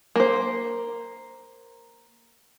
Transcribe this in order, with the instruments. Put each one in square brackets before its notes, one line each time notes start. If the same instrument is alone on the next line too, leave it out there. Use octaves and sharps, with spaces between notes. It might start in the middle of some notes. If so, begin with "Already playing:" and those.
[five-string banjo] A#3 C5